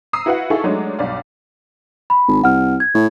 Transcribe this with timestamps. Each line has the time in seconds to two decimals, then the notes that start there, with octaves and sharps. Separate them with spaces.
0.13 A#5 D#6 E6 C7
0.26 E4 F#4 B4 F5 F#5
0.50 D#4 E4 G#4 A4 F5 C#6
0.64 F#3 G#3 A3 D4 D#4
0.99 B1 G2 D5 F5
2.10 B5
2.28 G#1
2.44 C2 F#5 F6
2.80 G#6
2.95 A2